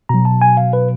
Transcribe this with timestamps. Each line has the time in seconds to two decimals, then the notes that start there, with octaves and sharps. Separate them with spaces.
0.09 B2 F#3 A#5
0.25 A5
0.41 G#5
0.57 F5
0.73 B4